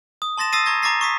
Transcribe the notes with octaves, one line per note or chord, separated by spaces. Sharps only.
D#6
A5 C6 A6 A#6 E7
D#6 E6 A6 A#6 C7 D#7
A#5 C#6 G#6 A#6
A#5 D6 A6 A#6 C7
C#6 D#6 B6